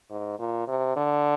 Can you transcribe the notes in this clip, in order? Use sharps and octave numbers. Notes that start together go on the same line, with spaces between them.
G#2
A#2
C3
D3